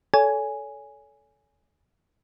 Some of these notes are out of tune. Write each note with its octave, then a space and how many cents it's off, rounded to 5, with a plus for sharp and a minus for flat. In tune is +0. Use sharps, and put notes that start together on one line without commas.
A4 -10 C#5 +35 G#5 +0